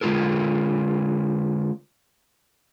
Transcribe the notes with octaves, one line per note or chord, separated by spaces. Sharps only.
D3 G#3 A#3 F4 A4 A#4